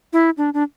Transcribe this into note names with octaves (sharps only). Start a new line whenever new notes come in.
E4
D4
D4